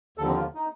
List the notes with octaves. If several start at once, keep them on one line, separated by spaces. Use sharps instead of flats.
D#2 D3 F3 A4
C4
F4
D#4